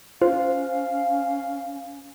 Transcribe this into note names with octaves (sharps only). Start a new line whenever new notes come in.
C#4 F4 C5 F5